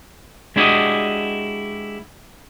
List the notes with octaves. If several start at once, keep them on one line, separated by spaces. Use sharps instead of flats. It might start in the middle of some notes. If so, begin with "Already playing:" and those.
G#3 D4 E4 F#4 G4 D#5